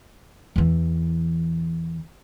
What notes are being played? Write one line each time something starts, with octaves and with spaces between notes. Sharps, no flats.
E2 E3